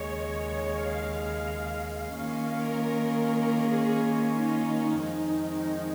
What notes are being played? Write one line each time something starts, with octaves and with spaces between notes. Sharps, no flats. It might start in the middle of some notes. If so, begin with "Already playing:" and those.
Already playing: D#2 C#3 G#3 C#5
F5
D#3 A#3 C#4 F4 F5
A#4
G#4
D#4
F2 D#3 G#3 C4